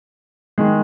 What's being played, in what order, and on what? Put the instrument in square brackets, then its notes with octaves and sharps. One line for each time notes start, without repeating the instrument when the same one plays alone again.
[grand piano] D#3 G#3